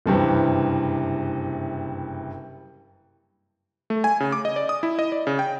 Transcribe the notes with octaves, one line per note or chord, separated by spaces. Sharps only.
F#1 G2 C3 E3
A3
G#5
C#3
D6
D#5
D5
D#6
E4
D#5
D5
C#3
G5